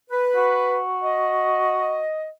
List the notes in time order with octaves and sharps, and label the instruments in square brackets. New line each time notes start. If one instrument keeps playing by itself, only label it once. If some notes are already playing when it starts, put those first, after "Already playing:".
[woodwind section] B4
[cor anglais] F#4
[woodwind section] D#5